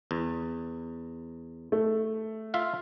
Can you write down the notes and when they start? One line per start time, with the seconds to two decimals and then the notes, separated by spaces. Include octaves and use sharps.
0.11 E2
1.72 A3
2.54 F4 E5 F5